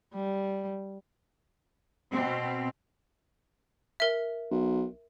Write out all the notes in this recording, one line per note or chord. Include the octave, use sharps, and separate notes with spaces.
G3
B2 C4
A#4 E5
B1